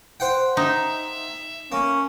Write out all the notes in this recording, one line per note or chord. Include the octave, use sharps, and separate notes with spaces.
C5 F#5 G5
D#4 E5
A#3 C#4